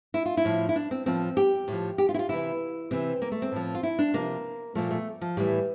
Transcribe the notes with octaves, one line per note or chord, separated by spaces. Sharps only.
E4
F4
E4
A2 F3
E4
D4
C4
A2 F3 C4
G4
A2 F3
G4
F4
E4
F4
C3 E3 E4
C3 E3 C4
A#3
A3
C4
A2 F3
F4
E4
D4
C3 F3 A#3
A#2 F3 A3
A3
F3
A2 E3 G3